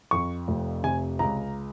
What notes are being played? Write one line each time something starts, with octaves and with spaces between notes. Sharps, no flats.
F2 C#6
F1
C3 G#5
C#2 A#5